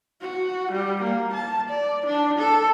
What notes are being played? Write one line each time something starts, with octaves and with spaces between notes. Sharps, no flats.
F#4
G3
A#3
A5
D5
D4
A4